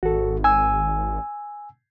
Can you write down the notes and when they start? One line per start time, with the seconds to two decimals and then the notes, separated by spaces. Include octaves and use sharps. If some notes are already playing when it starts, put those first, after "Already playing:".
0.03 G#1 F#4 A4
0.44 G#5 E6